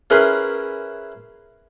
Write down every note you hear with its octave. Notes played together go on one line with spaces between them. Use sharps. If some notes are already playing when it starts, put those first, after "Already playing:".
C#4 E4 G#4 A#4 B4 C6